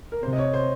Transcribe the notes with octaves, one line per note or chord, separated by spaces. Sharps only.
A#4
C3 C5
D#5
C#5
C5